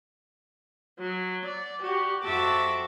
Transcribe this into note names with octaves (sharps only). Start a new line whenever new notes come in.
F#3
D5
F#4 G4
F2 F#4 E5 A5 D6